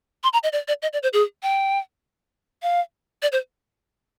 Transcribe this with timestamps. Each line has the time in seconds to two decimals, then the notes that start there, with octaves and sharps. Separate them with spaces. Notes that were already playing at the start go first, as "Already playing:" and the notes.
0.24 C6
0.33 A#5
0.43 D#5
0.53 D5
0.68 D5
0.82 D#5
0.93 D5
1.03 C5
1.13 G#4
1.43 G5
2.63 F5
3.22 D5
3.32 C5